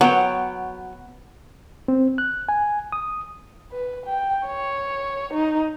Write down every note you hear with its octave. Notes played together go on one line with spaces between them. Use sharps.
F#3 B3 C#5 G5
C4
F#6
G#5
D#6
B4
G5
C#5
D#4